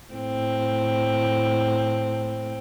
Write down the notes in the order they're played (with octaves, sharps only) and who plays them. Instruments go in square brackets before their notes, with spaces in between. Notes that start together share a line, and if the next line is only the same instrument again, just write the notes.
[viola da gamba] A2 C4